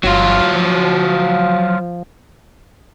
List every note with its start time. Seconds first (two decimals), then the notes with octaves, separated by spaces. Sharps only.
0.04 G1 F#3 F4
0.54 F3